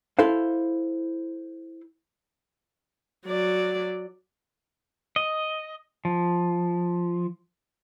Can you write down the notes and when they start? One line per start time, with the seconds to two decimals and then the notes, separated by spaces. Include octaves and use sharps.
0.19 E4 A4 C5 F5
3.26 F#3 D5
5.16 D#5
6.05 F3